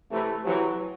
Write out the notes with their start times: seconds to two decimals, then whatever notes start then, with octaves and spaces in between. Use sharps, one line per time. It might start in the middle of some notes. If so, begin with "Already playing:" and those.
0.11 C3 E3 A3
0.45 C3 E3 F#3